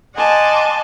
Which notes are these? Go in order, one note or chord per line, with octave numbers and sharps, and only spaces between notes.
D#5 F#5 G#5 A5 C6 D6